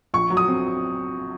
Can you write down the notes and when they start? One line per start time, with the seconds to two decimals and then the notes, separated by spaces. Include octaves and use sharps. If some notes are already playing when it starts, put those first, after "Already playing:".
0.14 A#1 C#6
0.30 F#3
0.37 D#6
0.48 C4